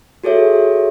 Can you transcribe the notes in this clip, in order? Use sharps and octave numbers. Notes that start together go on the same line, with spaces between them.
F#4 G#4 A4 C#5 E5